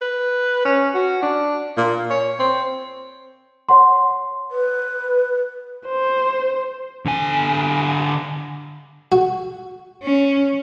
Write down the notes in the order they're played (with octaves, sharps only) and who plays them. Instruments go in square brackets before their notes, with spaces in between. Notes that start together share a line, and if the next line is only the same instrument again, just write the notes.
[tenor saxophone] B4
C#4
F#4
D4
A#2
C#5
C4
[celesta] C#5 F#5 C6
[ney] B4
[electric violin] C5
[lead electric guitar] D3 G#5
[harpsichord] F#4
[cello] C#4